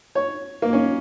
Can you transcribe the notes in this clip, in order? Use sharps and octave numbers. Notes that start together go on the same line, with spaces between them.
C#5
A#3
C#4